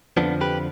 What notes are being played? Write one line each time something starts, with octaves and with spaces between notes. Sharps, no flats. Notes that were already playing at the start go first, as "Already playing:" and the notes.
F2 D3 F3 B3 D4
G4 B4